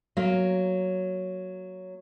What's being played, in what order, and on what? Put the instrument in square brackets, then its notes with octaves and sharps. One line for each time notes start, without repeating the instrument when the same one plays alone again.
[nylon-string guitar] F#3 A#3